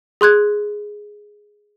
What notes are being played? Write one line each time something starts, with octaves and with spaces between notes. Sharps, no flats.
G#4 C6 F#6 G#6